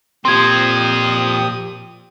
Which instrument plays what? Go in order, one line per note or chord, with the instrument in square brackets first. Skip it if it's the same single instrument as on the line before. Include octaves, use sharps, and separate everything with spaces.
[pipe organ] A#2 G4 D#6 [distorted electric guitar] F3 C4 [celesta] C6 G#6